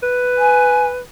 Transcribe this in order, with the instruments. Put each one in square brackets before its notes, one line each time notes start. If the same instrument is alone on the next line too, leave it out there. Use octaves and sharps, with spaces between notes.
[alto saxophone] B4
[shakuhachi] G#5